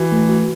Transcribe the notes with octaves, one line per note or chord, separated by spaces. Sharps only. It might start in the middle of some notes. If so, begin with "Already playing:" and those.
Already playing: E3 F#4
A3
F#4